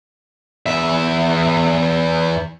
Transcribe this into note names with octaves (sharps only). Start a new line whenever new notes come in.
E2 E5